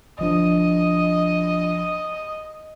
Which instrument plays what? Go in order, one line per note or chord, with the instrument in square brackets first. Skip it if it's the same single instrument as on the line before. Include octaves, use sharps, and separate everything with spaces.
[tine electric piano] G1 F3 D4 [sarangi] D#5 [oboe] D#6